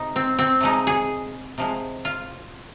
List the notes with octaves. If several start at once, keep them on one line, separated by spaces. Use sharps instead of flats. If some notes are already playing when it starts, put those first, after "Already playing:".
Already playing: C3 G#3 D#4
C4
C4
C3 F3 G#3 D#4
G#4
C3 F3 G#3
F4